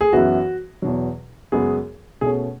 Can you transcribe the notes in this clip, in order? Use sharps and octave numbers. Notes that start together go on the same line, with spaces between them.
G#4
F#2 E3 B3 E4 F#4 B4
E2 B2 F#3
F#2 C#3 G#3 B3 F#4 G#4
B2 A3 C#4 G#4